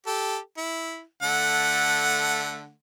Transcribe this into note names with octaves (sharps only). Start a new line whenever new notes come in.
G4 A4
E4
D3 A3 F#5